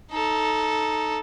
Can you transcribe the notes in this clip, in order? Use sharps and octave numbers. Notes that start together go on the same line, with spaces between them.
D#4 A4